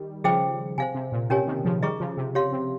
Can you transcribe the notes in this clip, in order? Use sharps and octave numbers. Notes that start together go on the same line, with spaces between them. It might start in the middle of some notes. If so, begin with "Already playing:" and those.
Already playing: D#3 G3
C#3 F3 G#4 C5 D#5 G5
C3 C5 F5 G#5
C3
A#2
C3 C#4 G4 A#4 C#5 G#5
C3 D#3
C#3 F3
D#3 G3 G#4 D#5 A#5 C#6
C#3 F3
C3
G4 C#5 F5 C6
C3